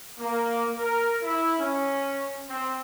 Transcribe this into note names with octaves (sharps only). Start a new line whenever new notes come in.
A#3
A#4
E4
C#4
C4